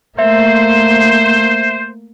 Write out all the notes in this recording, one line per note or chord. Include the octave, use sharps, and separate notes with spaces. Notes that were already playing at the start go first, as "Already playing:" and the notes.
A3 A#3 C5 E5